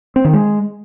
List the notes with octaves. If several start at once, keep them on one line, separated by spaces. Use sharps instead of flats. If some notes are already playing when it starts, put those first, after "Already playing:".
C4
D#3
G#3